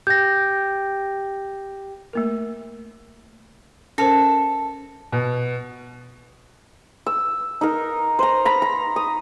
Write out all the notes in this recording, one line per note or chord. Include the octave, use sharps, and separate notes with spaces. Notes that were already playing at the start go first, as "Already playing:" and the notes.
G4 G5 G6 A#6
A3 A#3 A#4
C#4 A4 A#4 C5
B2
E6
D#4 A#4
C5 A#5
A#5 B5
A#5
D#6